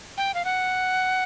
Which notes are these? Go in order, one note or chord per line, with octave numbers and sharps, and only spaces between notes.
G5
F5
F#5